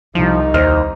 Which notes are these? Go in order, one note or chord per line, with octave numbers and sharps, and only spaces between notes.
C2 F3 D#4
D#2 C5 D#5 F6